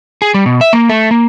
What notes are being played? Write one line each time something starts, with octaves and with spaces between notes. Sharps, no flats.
G#4
G3
B2
E5
A#3
A3
A#3